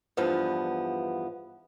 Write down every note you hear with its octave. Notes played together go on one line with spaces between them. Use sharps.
E2 G2 F3 B3